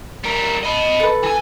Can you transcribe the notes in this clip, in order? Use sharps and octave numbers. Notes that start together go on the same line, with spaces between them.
G3 A#4
D#5 B5
A4 B4
E3 G#5